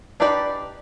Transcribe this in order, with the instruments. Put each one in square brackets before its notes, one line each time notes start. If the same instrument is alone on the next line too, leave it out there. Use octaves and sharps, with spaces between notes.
[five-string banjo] D4 D#4 G4 B4 D5